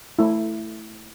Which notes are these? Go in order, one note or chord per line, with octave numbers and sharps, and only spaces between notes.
A3 E4